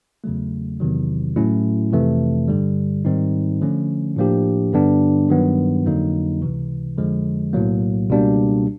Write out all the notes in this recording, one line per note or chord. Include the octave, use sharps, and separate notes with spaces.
E2 C#3 F#3 A3
E2 C3 D#3 F#3
A2 F#3 A3 C#4 E4
F2 C3 E3 A3
G2 D3 G3
G#2 D#3 G3 C4 D#4
D3 F3 A3 C#4
A2 F3 A#3 D4 G4
G2 D3 G3 B3 D4
G2 D#3 F#3 B3
F2 D3 F#3 A#3 D#4
C#2 C3 E3
F2 D3 F3 G#3
B1 A2 F#3 A#3
C#2 B2 G3 A#3 D4